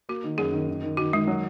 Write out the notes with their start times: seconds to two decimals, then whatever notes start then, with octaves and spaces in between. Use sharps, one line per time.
0.09 A#3 F#4
0.24 D#3
0.38 F#2 G#4
0.53 D#3
0.68 D#3
0.83 D#3
0.97 D#3 F#4
1.13 D#3 G#3
1.27 F#3